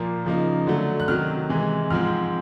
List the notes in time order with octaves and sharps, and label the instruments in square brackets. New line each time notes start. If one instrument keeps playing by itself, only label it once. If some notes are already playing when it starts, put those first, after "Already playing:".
Already playing: [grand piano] A#2 F3 A#3
C#3 F3 A#3 D#4
D3 F#3 A3
F#6
C3 D#3 F#3 F6
C3 E3 G#3
G#2 F3 G#3 C4 F6